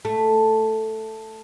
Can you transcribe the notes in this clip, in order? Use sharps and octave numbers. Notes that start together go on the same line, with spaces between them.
A3